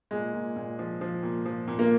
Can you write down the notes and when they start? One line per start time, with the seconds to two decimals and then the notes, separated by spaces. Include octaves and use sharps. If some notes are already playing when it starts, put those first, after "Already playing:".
0.11 A#2 G#3
0.34 A#2
0.56 A#2
0.79 F3
1.01 F3
1.23 A#2
1.46 F3
1.68 A#2
1.79 A#3